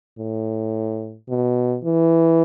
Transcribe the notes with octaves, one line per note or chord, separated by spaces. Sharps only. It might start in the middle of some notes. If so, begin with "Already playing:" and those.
A2
B2
E3